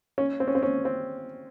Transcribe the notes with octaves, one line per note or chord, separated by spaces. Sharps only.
C#4
C4
C#4
C4
C#4
C4